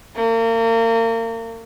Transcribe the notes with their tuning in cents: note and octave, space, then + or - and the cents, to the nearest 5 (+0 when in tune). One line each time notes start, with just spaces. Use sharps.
A#3 -35